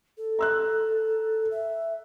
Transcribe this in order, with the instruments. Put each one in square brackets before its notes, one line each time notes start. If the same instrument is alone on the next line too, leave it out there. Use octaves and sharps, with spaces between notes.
[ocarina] A4
[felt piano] A#5 E6 F#6
[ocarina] E5